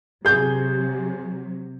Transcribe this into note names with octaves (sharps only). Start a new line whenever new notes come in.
C3 F#3 G#4 G6